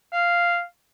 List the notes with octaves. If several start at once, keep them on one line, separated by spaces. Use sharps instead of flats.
F5